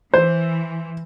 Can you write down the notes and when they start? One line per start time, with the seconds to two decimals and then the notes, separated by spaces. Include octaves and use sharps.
0.14 E3 C5